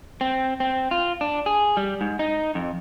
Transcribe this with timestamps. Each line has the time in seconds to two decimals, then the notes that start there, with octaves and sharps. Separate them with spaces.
0.21 C4
0.60 C4
0.91 F4
1.21 D4
1.46 G#4
1.77 G3
2.01 G#2
2.19 D#4
2.55 F2